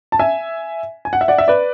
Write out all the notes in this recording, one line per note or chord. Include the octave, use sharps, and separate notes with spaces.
A5
E5 G#5
G#5
F#5
E5
D5 F#5
E5
B4 D5